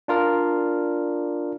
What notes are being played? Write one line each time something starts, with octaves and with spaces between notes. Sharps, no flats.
D4 F4 A#4 D5